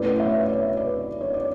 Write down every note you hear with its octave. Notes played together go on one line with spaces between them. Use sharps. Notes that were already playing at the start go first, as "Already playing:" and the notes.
Already playing: B2 A3 C#4 E4 B4 D5
C#5 E5
D5
C#5 E5
B4 D5
C#5
D5